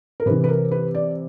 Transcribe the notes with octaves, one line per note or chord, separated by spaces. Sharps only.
A#4
C3 E3 B4
B4
A#4
B4
D5